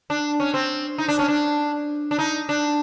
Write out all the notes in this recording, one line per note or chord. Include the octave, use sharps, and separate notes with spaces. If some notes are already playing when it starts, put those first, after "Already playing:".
D4
C#4
C4
D#4
D4
C#4
D4
D4
D#4
D4